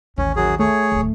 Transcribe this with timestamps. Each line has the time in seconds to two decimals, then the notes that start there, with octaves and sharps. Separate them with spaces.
0.18 A1 D#2 C#4
0.36 F#2 F#3 G#4
0.59 A3 G#4 C#5
0.92 D1 D#2